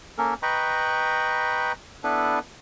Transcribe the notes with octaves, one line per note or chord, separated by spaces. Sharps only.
A#3 C#4 A4 A#4
B4 D#5 G5 A#5 B5 C#6
B3 D4 E4 A4 B4